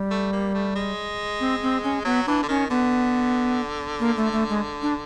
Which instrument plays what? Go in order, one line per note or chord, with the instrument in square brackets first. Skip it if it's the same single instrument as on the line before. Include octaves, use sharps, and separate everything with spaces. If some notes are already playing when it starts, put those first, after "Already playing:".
Already playing: [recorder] G3
[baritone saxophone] A3
A#3
A3
G#3
[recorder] C4
C4
C#4
[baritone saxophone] F#3 [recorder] B3
[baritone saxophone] E3 [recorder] D4
[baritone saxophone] D3
[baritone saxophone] D#3 [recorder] C#4
[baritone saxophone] D3 [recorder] B3
[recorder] A#3
A3
A3
G#3
D4